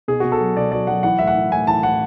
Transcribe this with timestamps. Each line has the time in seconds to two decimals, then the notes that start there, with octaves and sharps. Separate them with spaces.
0.08 B2 G#4
0.20 B2 F#4
0.32 A4
0.40 F#3
0.56 B2 D5
0.72 F#3 D5
0.87 F#3 F#5
1.03 E3 F#5
1.19 A2 E5
1.27 F#5
1.35 E3
1.51 A2 G#5
1.67 E3 A5
1.83 A2 F#5